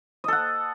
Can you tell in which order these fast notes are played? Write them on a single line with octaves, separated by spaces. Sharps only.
D#5 A4 F#5